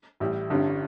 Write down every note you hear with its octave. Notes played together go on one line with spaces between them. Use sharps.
A1 A2 G3
G1 G2 D3 G3 C#4